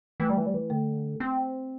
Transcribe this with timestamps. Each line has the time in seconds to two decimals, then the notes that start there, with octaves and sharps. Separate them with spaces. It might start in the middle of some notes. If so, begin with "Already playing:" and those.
0.20 E3 A3
0.29 G3
0.37 E3
0.46 G3
0.54 E3
0.70 D3 A3
1.20 C4